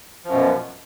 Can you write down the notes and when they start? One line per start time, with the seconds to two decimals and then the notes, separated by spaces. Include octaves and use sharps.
0.25 F3
0.28 F#2
0.32 B2